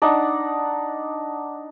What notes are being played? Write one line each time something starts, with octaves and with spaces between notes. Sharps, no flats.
D4 D#4 F#5